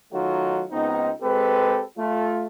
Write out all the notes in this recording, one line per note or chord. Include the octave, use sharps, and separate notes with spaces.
D#3 F#3 A3 D#4 F4 F#4
C#2 B3 C4 D#4
G#3 C4 G4 A4 B4
A3 F4